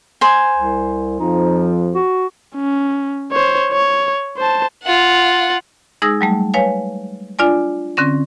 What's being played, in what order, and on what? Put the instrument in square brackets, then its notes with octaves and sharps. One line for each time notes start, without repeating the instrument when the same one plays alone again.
[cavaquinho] C5 G#5
[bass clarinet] C2
[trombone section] F2 F3 [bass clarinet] D#4
[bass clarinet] F#4
[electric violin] C#4
C5 C#5
C#5
C5 A5
[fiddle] F4 F#5
[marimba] G#3 D#4 G#4 D#6 E6 A#6
F#3 G3 A3
B4 C#5 F5 G#5
D4 F4 D5 G#5
D3 C4 C#4 A#6